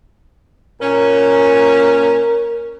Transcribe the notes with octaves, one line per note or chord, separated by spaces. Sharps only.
A#2 C#4 A#4